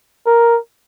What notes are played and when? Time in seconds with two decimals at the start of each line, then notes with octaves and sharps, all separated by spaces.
0.26 A#4